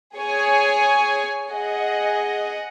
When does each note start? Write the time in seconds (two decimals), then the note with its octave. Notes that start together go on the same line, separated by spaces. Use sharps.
0.18 G#4 C#5 G#5
1.50 G#4 D#5 F#5